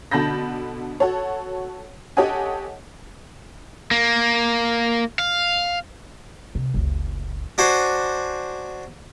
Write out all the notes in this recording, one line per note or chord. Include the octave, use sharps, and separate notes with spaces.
B2 D3 A5 B5 G6 A#6
F#4 A4 C#5
G4 A4 C#5 D#5 F#5 G#5
A#3
F5
C3
F#1 C#2
D4 F#4 C5 G#5